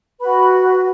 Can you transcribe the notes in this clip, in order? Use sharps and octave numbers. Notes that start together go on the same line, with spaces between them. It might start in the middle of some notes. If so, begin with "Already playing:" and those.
F#4 B4 B5